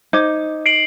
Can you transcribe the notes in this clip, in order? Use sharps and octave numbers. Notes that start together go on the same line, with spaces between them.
D#4 C5 D6 G#6
C7 D7 F#7